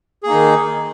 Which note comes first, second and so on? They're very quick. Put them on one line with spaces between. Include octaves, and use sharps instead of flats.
G#4 A#3 D#4 D#3